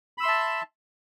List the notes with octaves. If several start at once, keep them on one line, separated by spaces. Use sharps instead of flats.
E5 A5 B5 C6 E6